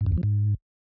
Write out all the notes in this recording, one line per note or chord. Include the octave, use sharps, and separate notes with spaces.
G#2
F#2
E2
F3
G#2